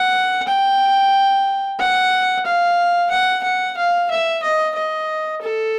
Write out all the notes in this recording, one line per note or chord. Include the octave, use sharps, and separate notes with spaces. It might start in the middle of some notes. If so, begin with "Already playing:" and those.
Already playing: F#5
G5
F#5
F5
F#5
F#5
F5
E5
D#5
D#5
A4